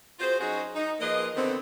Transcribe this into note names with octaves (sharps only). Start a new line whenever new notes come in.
F4 F#4 G#4 C5
F#3 C#4 D#4 F#4 G#4 C5
D#4
F3 A#3 G#4 B4 D#5
D3 D#3 B3 C4